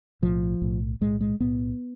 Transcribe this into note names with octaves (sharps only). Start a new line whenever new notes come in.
B1 A2 F3
B1 A2
B1 A2 G#3
G#3
B1 A2 B3